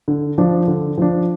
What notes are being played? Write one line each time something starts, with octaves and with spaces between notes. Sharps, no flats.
D3
F3 D4
D3
F3 D4